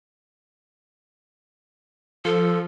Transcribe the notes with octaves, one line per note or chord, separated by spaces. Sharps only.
F3 A4